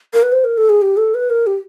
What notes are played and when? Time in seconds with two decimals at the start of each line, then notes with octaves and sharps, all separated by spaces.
0.14 A#4
0.23 B4
0.32 C5
0.44 A#4
0.58 A4
0.69 G#4
0.82 G4
0.97 A4
1.14 B4
1.30 A#4
1.47 G4